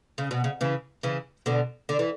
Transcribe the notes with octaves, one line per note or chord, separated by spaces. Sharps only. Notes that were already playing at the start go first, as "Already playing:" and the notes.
C#3
B2
C#3
C#3 E3
C#3 E3
B2 D3
D3
E3